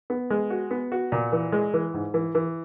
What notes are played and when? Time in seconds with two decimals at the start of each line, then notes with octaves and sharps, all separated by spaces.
0.10 B3
0.30 G#3
0.50 F#4
0.71 B3
0.92 F#4
1.12 A#2
1.32 E3
1.52 G#3
1.74 E3
1.94 G#2
2.14 E3
2.35 E3